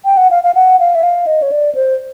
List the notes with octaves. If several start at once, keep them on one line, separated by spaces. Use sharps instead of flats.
G5
F#5
F5
F5
F#5
F5
E5
F5
D#5
C#5
D5
C5